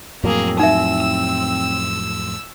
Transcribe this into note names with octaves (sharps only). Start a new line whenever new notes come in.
F2 A2 F#3 A#3 C4 G#4
D#4 E5 E6